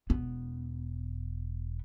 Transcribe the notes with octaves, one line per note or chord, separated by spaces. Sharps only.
E1 B3